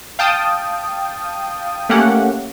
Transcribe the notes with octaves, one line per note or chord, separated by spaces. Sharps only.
F5 G5 A5 D#6
A3 A#3 C#4 G4 F#5